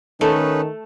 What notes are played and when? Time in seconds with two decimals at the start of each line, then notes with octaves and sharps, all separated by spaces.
0.21 D#3 A3 C#4 D#4 A4 B4